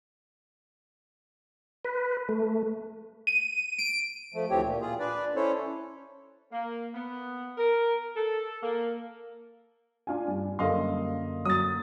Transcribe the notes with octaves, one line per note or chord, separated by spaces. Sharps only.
B4
A3
D#7
D7
F3 A3
D2 E3 F3 C4 G4 C#5
A#2
F4 G#4
D4 B4 D5
C#4 E4 A4 C5 C#5
A#3
B3
A#4
A4
A#3
D4 F4 G#5
G2
F#2 D3 A#3 D#5 F5 C6
F#3 D#6 A6